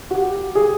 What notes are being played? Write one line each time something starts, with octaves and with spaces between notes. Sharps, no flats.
F#4
G4
G#4